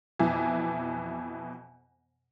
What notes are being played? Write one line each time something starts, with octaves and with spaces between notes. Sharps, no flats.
F2 B2 E3